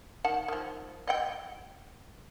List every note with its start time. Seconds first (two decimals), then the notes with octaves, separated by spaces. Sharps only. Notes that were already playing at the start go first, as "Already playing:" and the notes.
0.24 D#3 F#5 A5
0.48 D#3 F3
1.07 D#5 F#5 G5